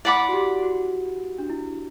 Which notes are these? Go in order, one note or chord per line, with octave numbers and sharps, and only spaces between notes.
E4 D5 F#5 B5 D6
F#4
G4
F#4
D4
E4